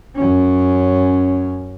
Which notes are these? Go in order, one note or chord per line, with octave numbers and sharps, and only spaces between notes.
F#2 C#4